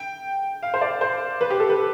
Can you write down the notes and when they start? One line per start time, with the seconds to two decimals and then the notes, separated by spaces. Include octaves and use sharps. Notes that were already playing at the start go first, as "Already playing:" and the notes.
Already playing: G5
0.63 F5
0.74 C5
0.81 D5
1.01 C5
1.41 B4
1.50 G4
1.60 A4
1.70 B4